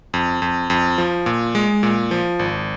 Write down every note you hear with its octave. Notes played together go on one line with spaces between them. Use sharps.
F2
F2
F2
F3
A#2
G#3
A#2
F3
G#1